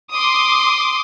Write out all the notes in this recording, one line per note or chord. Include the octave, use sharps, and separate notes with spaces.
C6 D6 D#6